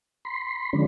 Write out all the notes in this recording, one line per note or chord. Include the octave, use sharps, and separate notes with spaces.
B5 C6
D3 F3 G#3 C#4 D4